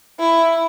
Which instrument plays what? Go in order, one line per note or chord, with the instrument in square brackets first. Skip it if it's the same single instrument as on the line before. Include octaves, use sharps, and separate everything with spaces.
[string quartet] E4